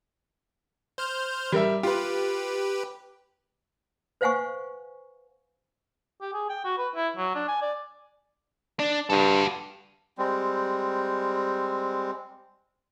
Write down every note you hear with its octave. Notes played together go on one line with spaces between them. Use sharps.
C5 F6 G6
G3 A#4 E5
F4 G4 B4
B4 C5 F5 F#5 G#5 C#6
G4
G#4
G5
F#4
B4
E4
F#3
D4
G#5
D5
D4
G2 F#4 A4
G3 G#3 C4